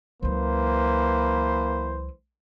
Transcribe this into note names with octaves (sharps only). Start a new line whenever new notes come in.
C#2 E3 F#3 A#3 B4 C5